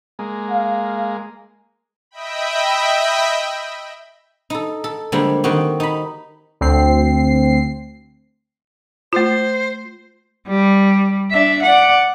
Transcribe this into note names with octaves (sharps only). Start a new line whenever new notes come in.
G#3 A#3
F5
D#5 E5 G5 B5
D#4 A4
A4
D3 F3 G3 G#3 A#3
D#3 A#3 C4 D#4 F#4 G4
D#4 B5
D2 C4 C7
A3 F4 C5
G3
D4 E5
D5 F#5